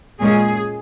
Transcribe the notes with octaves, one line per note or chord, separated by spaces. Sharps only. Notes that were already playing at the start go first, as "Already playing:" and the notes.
A#2 G#3 C#4 G#4